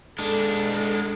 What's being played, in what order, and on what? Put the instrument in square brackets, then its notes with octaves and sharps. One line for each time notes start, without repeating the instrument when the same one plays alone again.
[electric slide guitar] G#3 D4 [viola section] A4